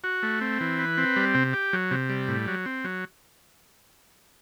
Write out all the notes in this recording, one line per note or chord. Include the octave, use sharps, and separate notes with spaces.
F#4
A3
C4
E3
B4
C4
G3
C3
G4
F#3
C3
G3
A2
F#3
C4
F#3